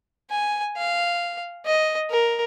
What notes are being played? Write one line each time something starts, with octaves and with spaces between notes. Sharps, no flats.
G#5
F5
D#5
A#4